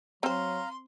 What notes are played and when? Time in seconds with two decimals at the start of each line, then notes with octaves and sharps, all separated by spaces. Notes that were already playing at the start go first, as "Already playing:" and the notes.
0.23 F#3 C4 C5 F5 A#5 C6